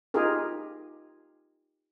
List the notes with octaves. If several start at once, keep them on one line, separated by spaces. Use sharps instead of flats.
D#4 F4 G4 G#4 A#4